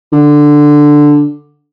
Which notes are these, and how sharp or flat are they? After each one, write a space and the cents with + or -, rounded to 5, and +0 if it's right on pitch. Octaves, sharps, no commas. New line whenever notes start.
D3 +5